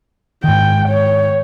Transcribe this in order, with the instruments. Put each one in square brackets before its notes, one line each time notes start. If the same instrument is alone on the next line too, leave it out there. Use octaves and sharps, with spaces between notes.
[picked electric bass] G#2 D#3 [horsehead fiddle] G5
[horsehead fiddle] C#5